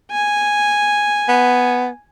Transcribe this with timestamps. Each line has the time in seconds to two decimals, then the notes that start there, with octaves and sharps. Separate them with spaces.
0.11 G#5
1.29 B3